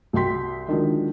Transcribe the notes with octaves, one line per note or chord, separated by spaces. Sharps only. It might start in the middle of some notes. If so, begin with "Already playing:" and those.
C2 F#4 G5 C6 B6
D3 D#3 F3 F#3 G#3 D4